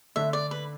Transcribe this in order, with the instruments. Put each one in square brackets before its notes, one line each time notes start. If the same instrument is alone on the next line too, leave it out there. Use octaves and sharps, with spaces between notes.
[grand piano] D3 A3 D4 [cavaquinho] E5
[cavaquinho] D5
B4